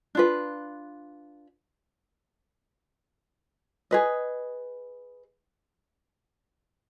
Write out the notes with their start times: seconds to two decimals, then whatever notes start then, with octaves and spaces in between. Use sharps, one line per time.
0.15 D4 F4 B4
3.91 G#4 B4 D#5